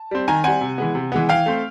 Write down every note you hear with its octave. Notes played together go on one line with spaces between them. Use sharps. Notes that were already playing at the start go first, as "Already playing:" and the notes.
Already playing: A5
G3 C4
D#3 G#5 A#5
G3 C4 F#5 G#5
C3
E3 G#3 B3
C3
E3 G#3 B3
E3 F5 G5
A3 C4